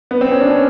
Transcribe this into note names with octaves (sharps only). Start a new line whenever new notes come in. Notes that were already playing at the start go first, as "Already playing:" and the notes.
B3
C4
C#4
D4
C#4